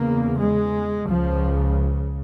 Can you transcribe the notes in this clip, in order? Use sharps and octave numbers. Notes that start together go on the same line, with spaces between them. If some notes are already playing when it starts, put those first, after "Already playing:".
Already playing: E2 C#3 A#3
G#3
C#2 C#3 F3